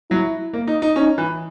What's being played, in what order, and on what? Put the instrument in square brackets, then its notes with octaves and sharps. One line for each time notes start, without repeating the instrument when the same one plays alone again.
[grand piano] F#3 [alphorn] E4
[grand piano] A#3
D#4
D#4
[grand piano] C#4 [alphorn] D#4
[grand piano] E3